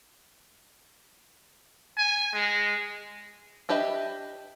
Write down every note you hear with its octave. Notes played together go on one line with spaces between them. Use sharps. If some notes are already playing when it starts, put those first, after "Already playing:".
G#5
G#3
D4 G4 B4 D#5 E5